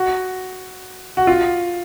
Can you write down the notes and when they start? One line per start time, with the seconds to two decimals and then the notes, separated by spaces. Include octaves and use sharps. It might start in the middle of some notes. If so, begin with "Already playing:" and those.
Already playing: F#4
1.17 F#4
1.27 F4